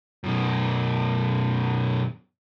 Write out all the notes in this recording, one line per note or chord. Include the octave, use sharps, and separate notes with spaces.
F#2 B2